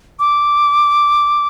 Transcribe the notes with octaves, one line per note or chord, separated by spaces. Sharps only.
D6